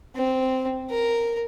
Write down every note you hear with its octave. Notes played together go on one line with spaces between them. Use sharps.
C4
A#4